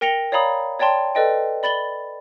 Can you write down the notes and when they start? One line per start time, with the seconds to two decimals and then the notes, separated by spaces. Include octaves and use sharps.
0.01 A#4 G5 A#6 C#7 F7 G7
0.32 C#5 D5 F5 A#5 B5 D#6
0.79 C#5 D5 G5 A5 C6
1.15 A4 B4 D5 D#5 G5
1.63 D5 B5 A6 F#7 G7